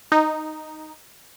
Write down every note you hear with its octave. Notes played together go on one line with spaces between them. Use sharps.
D#4